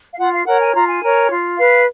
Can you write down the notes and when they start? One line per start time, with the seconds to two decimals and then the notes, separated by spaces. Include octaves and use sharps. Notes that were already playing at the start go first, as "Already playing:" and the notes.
0.14 F5
0.18 F4 F#5
0.33 F5
0.46 A#4 C#5 F#5
0.60 G#5
0.73 F4 A#5
0.87 G#5
1.02 A#4 C#5
1.30 F4
1.58 B4 F5